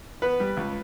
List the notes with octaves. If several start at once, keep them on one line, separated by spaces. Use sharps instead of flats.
B3 B4
G3
C#2